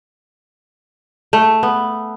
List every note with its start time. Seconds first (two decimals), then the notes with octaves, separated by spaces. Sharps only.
1.33 A3
1.63 B3